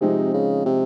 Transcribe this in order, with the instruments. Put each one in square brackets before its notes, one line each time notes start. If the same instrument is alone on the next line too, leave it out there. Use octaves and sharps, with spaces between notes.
[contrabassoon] C3 [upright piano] F3 G#3 C4 D#4 G#4
[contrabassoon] C#3
C3